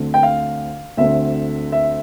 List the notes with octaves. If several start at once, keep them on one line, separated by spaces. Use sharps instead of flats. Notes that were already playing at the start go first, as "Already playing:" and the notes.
Already playing: D2 D3 A3 C4
G5
F5
D2 D3 A3 C4 E5
E5